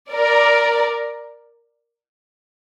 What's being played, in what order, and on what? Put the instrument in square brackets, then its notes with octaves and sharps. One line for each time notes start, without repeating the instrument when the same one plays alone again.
[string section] A#4 D5